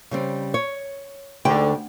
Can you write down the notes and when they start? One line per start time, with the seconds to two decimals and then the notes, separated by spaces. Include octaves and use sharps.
0.11 C#3 G3 C4
0.54 C#5
1.45 D2 G#2 D3 G5